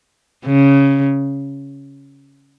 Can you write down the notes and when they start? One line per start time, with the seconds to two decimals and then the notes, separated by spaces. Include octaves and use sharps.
0.46 C#3